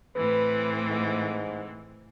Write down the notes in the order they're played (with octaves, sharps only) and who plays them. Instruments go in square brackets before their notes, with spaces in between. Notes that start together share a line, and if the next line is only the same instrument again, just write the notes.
[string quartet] A2 E3 C4 [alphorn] B4
[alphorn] G#2